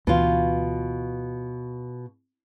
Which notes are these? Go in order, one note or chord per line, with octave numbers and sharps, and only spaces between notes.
D2 B2 E3 F4